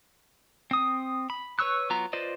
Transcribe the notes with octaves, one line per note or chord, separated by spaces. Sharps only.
C4 D#6
B5
B4 C#5 C#6 E6 F#6
F#3 B3 F4 A#5
F4 B4 C5 D5 D#5